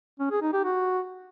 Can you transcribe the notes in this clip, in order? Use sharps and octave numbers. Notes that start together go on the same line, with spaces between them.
C#4
G#4
D#4
G4
F#4